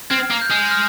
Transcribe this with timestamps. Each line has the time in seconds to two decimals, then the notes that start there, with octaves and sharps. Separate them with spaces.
0.10 C4 F6 G#6
0.31 A#3
0.41 G6
0.51 G#3
0.71 F6